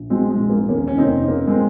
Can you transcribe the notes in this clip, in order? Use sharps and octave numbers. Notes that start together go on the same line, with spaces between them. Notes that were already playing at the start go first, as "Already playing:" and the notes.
Already playing: A#1
F#3 G#3 C4
G#3
A#1
A#3
D#2 A#3 C#4
C#4
F1 C4 D#4
C#3 A#3
G#3 C4